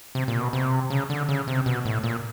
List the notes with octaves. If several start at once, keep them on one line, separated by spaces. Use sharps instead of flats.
C3
A#2
B2
C3
C#3
D3
C#3
C3
B2
A2
A#2